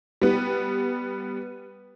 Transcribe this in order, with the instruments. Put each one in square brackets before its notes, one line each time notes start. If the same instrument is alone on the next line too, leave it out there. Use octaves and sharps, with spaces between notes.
[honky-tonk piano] G3 B3